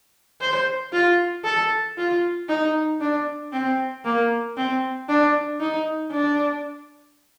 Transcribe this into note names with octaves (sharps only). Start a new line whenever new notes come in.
C5
F4
A4
F4
D#4
D4
C4
A#3
C4
D4
D#4
D4